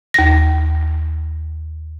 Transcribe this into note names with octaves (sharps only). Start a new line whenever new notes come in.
D#2 A#6